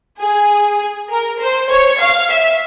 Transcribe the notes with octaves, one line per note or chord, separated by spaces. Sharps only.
G#4
A#4
C5
C#5
F5
E5